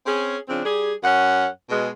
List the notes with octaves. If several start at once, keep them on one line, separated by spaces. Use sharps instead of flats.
C4 C#4 G#4
C#3 F3 C4 D4
G3 G4 G#4
F#2 C#4 F#5
B2 G#3